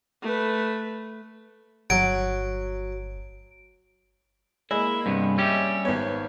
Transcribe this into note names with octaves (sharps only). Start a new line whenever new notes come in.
A3 B4
G1 F#3 D7
G#3 A#3 E4 B5
G2 C3 B3
G3 C#4 G4 E5
G#1 B3 C#5